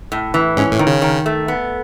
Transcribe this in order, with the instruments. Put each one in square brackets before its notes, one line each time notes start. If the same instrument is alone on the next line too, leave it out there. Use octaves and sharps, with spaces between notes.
[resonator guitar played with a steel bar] A2
E3
[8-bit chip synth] G#2 [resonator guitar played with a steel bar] C#4
[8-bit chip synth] A2
[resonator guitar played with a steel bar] D#3
[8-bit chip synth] C#3
[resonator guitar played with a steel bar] D#3
A3
B3